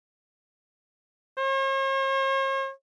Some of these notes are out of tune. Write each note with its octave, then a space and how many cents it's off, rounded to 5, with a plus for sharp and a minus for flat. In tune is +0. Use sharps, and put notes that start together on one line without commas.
C#5 -45